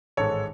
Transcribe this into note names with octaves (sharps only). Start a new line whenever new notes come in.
A1 G#2 D#3 G#3 A4 C#5